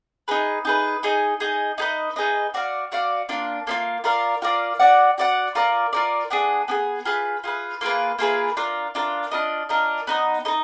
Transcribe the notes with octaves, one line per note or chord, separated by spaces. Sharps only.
D#4 G#4 B4
D#4 G#4 B4
D#4 G#4 D#5
D#4 G#4 D#5
D#4 G#4 B4 D#5
D#4 G#4 B4 D#5
F#4 D5 F5
F#4 D5 F5
A#3 D4 F4
A#3 D4 F4
F4 A#4 D5 F5
F4 A#4 D5 F5
F#4 D5 F#5
F#4 D5 F#5
F4 A#4 D5
F4 A#4 D5
B3 D4 G#4
B3 D4 G#4
F4 G#4 B4
F4 G#4 B4
A#3 F4 G#4 B4
A#3 F4 G#4 B4
D4 F4 A#4
D4 F4 A#4
D4 F4 A#4 D#5
D4 F4 A#4 D#5
B3 D#4 A#4 D#5
D#4 A#4 D#5